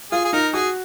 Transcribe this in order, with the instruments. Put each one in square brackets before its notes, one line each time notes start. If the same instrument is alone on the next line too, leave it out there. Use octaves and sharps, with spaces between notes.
[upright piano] F4 [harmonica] G#4
[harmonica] G#4
[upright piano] D#4 [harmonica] A#4
[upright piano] F#4 [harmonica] G#4